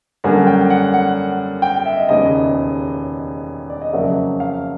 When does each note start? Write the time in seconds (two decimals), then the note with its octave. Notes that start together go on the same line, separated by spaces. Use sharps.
0.24 F#2 D3 G3 A#3 G#5
0.47 G5
0.70 F#5
0.94 F#5
1.62 G5
1.86 E5
1.97 D#5
2.09 E1 D#2 C#3 D#5
3.70 D5
3.81 D#5
3.93 F2 C#3 F#3 A#3 E5
4.40 F5